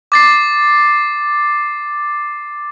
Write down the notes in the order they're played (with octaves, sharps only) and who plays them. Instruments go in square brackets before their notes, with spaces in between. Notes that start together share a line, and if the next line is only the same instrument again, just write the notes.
[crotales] D6 A6 C7